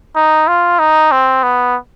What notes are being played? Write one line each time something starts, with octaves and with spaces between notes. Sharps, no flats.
D#4
F4
D#4
C4
B3